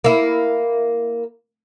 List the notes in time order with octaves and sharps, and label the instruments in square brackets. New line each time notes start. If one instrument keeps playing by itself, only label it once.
[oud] A#3 E4